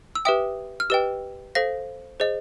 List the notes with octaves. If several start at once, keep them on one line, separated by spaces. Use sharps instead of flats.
E6
G4 B4 E5 G5 D#6
F6
G4 B4 D#5 G5 E6
A4 C5 F5 A#6
G#4 C5 D#5